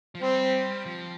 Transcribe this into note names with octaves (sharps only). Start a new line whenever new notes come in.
F3
G3 C4
F3